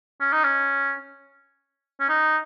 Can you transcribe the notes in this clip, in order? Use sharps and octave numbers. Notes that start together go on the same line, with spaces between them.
C#4
D#4
C#4
C#4
D#4